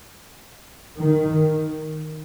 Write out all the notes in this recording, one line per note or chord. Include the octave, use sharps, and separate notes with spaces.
D#3